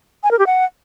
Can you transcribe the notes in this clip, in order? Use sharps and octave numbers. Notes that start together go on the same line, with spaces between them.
G#5
A#4
G4
F#5